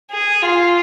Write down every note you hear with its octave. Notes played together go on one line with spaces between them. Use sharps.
G#4
F4